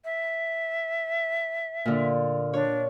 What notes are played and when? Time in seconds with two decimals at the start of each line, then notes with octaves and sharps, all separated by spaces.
0.05 E5
1.85 A#2 D3
2.53 D4 C#5